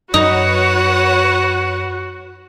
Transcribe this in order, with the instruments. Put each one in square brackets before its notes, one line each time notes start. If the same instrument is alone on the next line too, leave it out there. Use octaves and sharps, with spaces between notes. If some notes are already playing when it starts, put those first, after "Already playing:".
[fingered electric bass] F#2 [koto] D#4 [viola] F#4 [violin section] B4 C#5 F#5